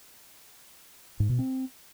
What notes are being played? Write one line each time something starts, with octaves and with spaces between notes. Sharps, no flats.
G#2
B2
C4